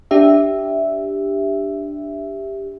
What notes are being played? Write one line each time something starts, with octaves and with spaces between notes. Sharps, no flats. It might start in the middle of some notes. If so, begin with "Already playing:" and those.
D4 G4 E5